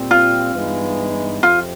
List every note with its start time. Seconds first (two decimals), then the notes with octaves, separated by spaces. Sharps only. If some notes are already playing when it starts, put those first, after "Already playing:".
Already playing: A#2 G3 C4
0.11 F4
0.55 G2 E3 G#3 B3 D#4
1.43 F2 C3 F4